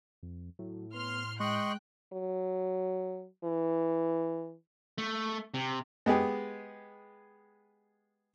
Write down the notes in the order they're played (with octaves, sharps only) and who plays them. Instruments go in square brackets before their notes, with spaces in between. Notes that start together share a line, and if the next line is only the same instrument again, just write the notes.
[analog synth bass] F2
[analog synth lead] A2 [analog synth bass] F#3
[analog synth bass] B3 [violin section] C6 F6
[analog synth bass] G#3 [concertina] D#5 C6 C#6 [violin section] G5 F#6
[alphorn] F#3
E3
[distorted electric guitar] A3
C3
[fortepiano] G#3 B3 G4 G#4